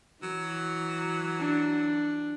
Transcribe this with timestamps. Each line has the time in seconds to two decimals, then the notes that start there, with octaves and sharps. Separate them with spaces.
0.23 E3 F#3
1.40 D4